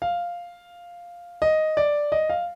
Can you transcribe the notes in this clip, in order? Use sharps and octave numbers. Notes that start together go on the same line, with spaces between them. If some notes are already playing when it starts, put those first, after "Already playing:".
F5
D#5
D5
D#5
F5